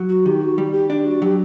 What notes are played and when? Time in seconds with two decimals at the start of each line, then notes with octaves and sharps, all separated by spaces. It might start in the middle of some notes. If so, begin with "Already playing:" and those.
Already playing: F#3
0.09 F#4
0.25 D#3 G4
0.41 F#4
0.58 G3 G4
0.73 G4
0.90 D4 G4
1.06 F#4
1.22 F#3 G4